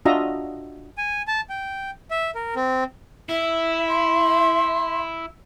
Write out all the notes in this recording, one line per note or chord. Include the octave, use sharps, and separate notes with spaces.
D4 F4 F#4 D#5 E5 A#5
G#5
A5
G5
E5
A#4
C4
E4 E5
C6